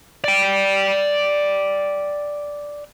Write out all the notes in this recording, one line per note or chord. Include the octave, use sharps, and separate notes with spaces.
D5 G5